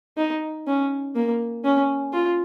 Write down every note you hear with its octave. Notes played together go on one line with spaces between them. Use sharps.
D#4
C#4
A#3
C#4
F4